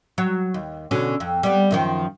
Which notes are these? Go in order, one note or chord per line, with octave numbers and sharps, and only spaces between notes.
F#3 C#5
D#2
B2 D3 C#4
F2
G3 B3
F#2 D#3 F3